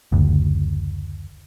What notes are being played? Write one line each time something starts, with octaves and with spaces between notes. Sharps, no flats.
F#1 D2